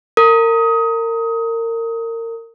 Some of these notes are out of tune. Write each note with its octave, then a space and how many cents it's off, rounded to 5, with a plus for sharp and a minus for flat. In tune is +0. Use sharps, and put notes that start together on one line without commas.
A#4 -30